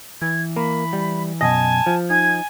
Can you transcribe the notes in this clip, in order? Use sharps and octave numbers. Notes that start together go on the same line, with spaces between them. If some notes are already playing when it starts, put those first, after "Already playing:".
E3 G#6
A#3 B5
G3
F#2 B2 D#5 G#5 A5
F3
D#4 G#5 G#6